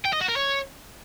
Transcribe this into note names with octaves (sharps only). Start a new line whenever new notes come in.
G5
D#5
F#4
A#4
C#5